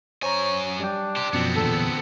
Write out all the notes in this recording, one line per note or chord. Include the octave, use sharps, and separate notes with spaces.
F#2 C5 C#5 G#5 A#5
G3 D4 G5
G4 C5
F#2 B2 F3 B3 C4
E2 A#2 D3 A4